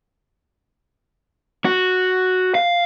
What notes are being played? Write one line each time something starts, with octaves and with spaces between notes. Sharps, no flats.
F#4
F5